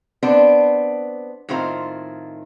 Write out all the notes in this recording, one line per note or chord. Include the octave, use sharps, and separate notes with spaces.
B3 C4 D4 C5 D5
A2 D#3 C4 F4 C5 A#5